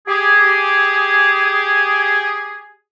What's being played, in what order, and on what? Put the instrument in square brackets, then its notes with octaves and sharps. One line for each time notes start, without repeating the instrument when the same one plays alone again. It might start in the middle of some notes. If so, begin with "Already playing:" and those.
[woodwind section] G4 G#4